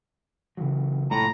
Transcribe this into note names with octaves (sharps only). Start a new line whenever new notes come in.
C#3 E3 F#3
F1 A#1 A2 A#5